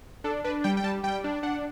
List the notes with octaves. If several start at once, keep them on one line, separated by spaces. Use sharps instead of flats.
D4 A4
D4 B4
G3 G5
G5
G3 A5
G3 G5
D4
D4 F#5